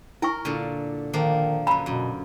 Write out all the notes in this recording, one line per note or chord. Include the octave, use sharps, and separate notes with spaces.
E4 A#4 G#5 C#6
A#2 D3
D#3 F3 A#3 D4
F#2 D3 A#5 B5
F#2 B2